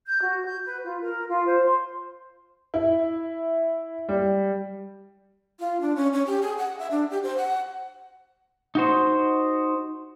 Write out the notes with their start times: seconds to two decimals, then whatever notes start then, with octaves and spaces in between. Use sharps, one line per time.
0.05 G6
0.21 F#4
0.44 G6
0.64 B4
0.84 F4
1.01 A#4
1.28 F4
1.46 C5
1.65 C6
2.74 E4
4.09 G3
5.60 F4
5.81 D4
5.96 C#4
6.13 C#4
6.26 G4
6.42 G#4
6.58 F#5
6.79 E5
6.91 D4
7.10 G4
7.23 C5
7.38 F#5
8.75 D#4 F#4 C5